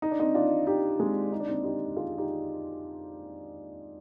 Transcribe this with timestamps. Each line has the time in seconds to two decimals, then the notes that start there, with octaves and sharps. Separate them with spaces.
0.02 D#4
0.11 D4
0.20 C4 D#4
0.35 D4 F4
0.67 D#4 G4
0.99 G#3 C4
1.32 D#4
1.40 D4
1.48 C4 D#4
1.64 D#4 G4
1.96 F4 G#4
2.18 D#4 G4